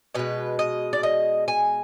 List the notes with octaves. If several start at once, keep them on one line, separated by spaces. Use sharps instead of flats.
B2 G#3 B4
D#5
D5
D#5
G#5